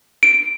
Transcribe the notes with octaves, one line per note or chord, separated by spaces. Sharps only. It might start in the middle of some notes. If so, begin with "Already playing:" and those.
D7